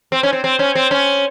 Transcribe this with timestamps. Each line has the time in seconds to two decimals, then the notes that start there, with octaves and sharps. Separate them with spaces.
0.12 C4
0.23 C#4
0.33 C4
0.44 C4
0.59 C#4
0.75 C4
0.91 C#4